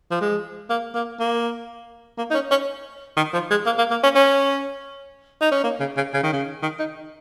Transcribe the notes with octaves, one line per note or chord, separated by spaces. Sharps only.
F3
G#3
A#3
A#3
A#3
A#3
D#4
C#4
C#4
D#3
F3
G#3
A#3
A#3
A#3
C#4
C#4
D#4
C#4
A#3
C#3
C#3
C#3
D#3
C#3
D#3
D#4